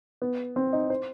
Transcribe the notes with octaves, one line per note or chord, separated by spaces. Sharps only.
B3
C4
D#4
C5